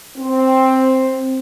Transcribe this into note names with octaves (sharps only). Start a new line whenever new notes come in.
C4